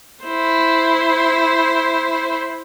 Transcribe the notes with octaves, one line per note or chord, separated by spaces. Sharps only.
E4 C5